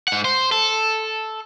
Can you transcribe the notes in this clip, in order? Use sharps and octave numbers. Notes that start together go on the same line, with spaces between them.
G#2 F#5
C5
A4